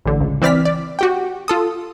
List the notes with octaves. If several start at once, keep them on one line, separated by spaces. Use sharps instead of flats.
A1 D3
C#2
E3 C4 D5 F6 B6
D5
F#4 G4 G5
F4 A4 D#6